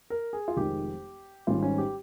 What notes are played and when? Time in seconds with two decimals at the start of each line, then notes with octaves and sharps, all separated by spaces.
0.10 A#4
0.33 G#4
0.48 F4
0.57 F1 F2 D#3 G#3 G4
1.47 G#1 G#2 D#3 G3 C#4 F4
1.62 C#4
1.78 G4